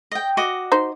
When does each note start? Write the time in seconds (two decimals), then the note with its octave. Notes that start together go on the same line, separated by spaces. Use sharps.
0.12 D#5 G5
0.37 F#4 D#5 D6
0.72 D#4 C5